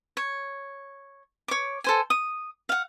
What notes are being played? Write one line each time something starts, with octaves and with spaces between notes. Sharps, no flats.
C#5
C#5 D6
A4 C5 G#5
D#6
F5 F#5